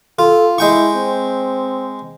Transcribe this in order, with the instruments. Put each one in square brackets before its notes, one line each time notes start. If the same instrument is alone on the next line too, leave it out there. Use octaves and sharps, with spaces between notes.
[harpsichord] F4 [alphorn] A4
[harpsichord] G#3 G5 C#6 [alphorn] E4
[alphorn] C4